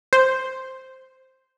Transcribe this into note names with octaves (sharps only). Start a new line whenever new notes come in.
C5